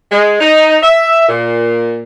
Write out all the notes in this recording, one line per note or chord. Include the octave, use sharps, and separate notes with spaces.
G#3
D#4
E5
A#2